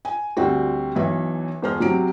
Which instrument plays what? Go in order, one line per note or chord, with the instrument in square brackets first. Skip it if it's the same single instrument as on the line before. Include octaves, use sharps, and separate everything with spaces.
[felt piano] G#5
D2 G3 C4 F#4
B1 E3 E5
E1 C5 F6
C3 F#3 D7